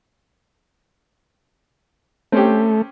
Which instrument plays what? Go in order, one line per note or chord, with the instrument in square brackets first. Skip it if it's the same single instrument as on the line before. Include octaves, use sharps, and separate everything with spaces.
[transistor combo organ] A3 [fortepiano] C4 C#4 G4